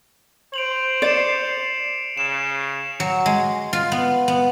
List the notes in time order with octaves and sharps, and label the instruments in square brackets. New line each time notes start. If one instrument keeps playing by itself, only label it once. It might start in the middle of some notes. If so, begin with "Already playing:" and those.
[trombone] C5 [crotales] D7 F7 F#7
[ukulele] D5 [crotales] C7 C#7 E7
[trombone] C#3 [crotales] E7
[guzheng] F#3
G#3
F4
B3
B3